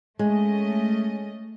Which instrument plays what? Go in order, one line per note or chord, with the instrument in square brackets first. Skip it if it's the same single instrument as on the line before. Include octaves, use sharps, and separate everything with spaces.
[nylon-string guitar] G#3 [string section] A3 C#4 D#5